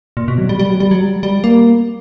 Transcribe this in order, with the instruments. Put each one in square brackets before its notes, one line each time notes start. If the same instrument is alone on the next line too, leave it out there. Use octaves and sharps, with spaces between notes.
[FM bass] A#2
B2
F#3
G3
G3
F#3
G3
F#3
G3
G3
A#3